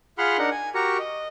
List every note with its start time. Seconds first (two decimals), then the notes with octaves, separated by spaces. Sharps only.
0.18 F4 G#4 F#5 B5 C6 F6
0.38 D4 D#4 A#4 F#5
0.51 G#5
0.75 F#4 G4 A#4 A#5 C#6
0.99 D#5